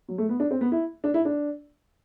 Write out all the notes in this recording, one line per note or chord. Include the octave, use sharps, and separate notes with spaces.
F#3
A3
B3
D4
C4
B3
E4
D4
E4
D4